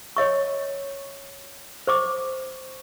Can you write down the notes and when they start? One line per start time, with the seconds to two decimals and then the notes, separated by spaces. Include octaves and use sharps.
0.17 C#5 D#5 C#6
1.87 C5 C#6 D6